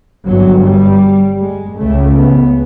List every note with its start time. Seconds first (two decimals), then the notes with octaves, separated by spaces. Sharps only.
0.25 G1 G2 F#3
0.63 G3
1.39 G#3
1.77 C#2 C#3 A3
2.16 B3